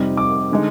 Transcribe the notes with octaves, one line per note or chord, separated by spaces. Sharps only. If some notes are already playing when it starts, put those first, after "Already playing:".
Already playing: F2 C3 G3 C4 D#4
D6
D3 G#3 D#4